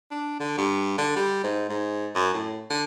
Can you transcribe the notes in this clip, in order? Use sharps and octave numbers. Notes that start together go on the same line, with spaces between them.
D4
D3
G2
D3
G3
G#2
G#2
F#2
A2
D3